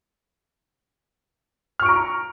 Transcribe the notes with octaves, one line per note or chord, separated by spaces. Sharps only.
A#5 C#6 F6 D7